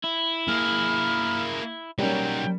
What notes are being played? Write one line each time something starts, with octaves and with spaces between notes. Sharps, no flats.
E4
A#3 G#4 F6
F#3 G3 A#3 C#4 D#4 G5